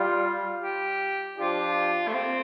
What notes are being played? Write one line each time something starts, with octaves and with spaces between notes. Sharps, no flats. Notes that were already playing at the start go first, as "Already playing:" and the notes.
Already playing: G3 F4
G4
F3 D4 F4 G4
A3
C4